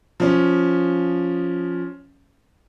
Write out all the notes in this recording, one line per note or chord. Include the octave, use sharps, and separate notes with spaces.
F3 C#4